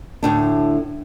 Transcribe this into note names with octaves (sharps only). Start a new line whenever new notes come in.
D2 A2 D4